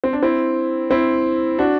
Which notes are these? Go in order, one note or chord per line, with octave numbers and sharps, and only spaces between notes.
C4
D4
C4 E4
C4 E4
D4 F#4